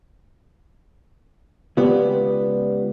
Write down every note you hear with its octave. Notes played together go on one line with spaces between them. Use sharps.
C#2 B3 F4 G4 D5